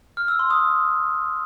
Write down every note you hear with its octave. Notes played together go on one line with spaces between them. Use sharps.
F6
E6
C6
D#6